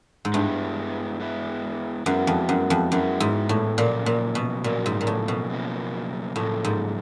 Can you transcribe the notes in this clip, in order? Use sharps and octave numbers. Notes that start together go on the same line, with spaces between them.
G#2
G2 G#3 B3 E4
G#3 B3 E4
F#2 G#3 B3 E4
F2
F#2
F2
F#2 G#3 B3 E4
G#2
A2
F#2 A#2 C#3 F3 A#3
A#2
B2
F#2 A#2 C#3 F3 A#3
G#2
A#2
A2
B2
F#2 C#3 F3 A#3
F#2 A2 C#3 F3 A#3
G#2